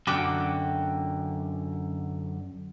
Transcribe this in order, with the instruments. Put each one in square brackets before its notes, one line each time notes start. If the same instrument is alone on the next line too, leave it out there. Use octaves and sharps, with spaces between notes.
[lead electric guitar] F#2 D3 [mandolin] F#4 G5 D6